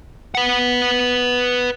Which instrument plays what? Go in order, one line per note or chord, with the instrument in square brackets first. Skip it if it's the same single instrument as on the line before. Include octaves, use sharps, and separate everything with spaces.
[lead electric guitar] B4 F#5